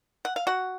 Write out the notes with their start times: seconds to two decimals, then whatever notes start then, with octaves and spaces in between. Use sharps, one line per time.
0.25 F#5
0.36 F5
0.47 F#4 F#5